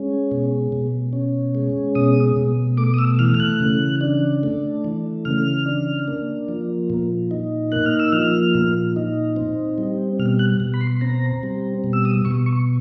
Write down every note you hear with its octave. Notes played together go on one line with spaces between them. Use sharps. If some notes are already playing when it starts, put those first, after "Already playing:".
Already playing: G#3 C#4
B2
B2
C#4
G#3
B2 D#6
B2
A3 D6
D#6
E6
E3 F6
F6
F#6
C#3
D4
A3
E3
C#3 F6
D4
A#3
F3
A#2
D#4
A#3 F#6
F6
E6
F3 F6
A#2
D#4
C4
G3
B2 F6
F#6
B2
B5
C6
C4 A#5
G3
B2
E6
D#6
B2 C#6
C#6